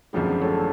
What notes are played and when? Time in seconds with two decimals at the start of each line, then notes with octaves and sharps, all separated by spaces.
0.13 G#1 F#2 D3 F3 G3 G#3
0.41 A2 A3